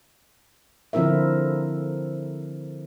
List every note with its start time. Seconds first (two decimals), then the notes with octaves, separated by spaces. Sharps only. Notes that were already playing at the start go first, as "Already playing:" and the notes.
0.93 D3 F3 C4 E4 A#4 E5